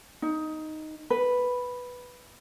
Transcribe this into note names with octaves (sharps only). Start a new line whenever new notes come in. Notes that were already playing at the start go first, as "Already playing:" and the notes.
D#4
B4